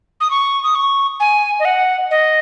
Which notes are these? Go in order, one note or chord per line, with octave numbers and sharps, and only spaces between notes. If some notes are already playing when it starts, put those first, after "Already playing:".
D#6
C#6
D#6
C#6
G#5
D#5
F#5
D#5